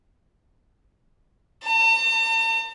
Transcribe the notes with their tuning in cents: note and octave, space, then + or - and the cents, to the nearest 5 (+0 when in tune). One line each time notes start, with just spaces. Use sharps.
A5 +45